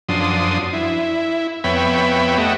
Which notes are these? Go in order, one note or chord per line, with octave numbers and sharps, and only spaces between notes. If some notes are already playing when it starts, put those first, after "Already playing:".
F#2 F3 D4 C6 D#6
E4
F2 B3 C#5 E5 G5 B5
A3 G4 D#5 E5 F#5